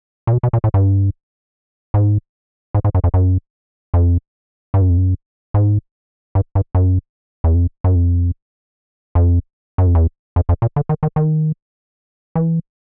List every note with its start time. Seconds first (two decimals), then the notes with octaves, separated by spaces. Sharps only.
0.27 A#2
0.33 B2
0.43 B2
0.53 A#2
0.64 A2
0.74 G2
1.94 G#2
2.74 G#2
2.84 G#2
2.95 F#2
3.04 F2
3.14 F#2
3.94 F2
4.74 G2
4.81 F#2
4.90 F2
4.97 F#2
5.54 G#2
6.35 G2
6.55 G2
6.75 F#2
7.44 E2
7.55 F2
7.84 F#2
7.95 F2
9.15 F2
9.78 F#2
9.87 F2
9.95 E2
10.36 F2
10.49 F2
10.62 A#2
10.76 D3
10.89 D#3
11.03 D#3
11.16 D#3
12.35 E3